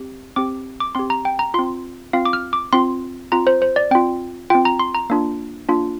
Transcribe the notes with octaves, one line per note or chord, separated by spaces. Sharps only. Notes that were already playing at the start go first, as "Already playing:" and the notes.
Already playing: C4 G4
C4 G4 D6
D6
C4 G4 C6
A#5
G5
A#5
C4 F4 C6
C4 F4 F5
D6
F6
D6
C4 F4 C6
C4 F4 A#5
C5
C5
D5
C4 F4 G5
C4 F4 G5
A#5
C6
A#5
A#3 D4 F4
A#3 D4 F4